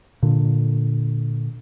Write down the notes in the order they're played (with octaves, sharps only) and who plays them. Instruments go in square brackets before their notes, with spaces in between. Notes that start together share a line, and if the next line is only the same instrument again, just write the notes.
[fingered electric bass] A#2 D3